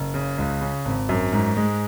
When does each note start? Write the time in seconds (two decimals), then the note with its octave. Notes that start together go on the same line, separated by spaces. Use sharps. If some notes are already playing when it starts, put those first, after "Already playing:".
Already playing: F#1
0.14 C#3
0.38 C#2
0.61 C#3
0.85 G#1
1.09 F#2
1.33 G#2
1.57 G#3